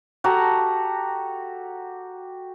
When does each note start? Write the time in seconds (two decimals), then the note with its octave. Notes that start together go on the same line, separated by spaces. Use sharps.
0.24 F#4 G4 A4 A#5